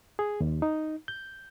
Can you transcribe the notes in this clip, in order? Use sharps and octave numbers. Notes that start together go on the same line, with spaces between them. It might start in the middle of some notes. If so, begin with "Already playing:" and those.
G#4
D#2
D#4
G6